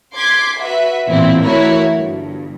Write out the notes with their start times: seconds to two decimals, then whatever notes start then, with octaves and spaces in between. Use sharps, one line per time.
0.15 C6 D6 G#6 B6
0.59 F#4 B4 E5
1.09 A1 E2 A#2 C4 E4
1.43 E3 A3 E4 F#4 A#4 C#5
1.93 G1 G2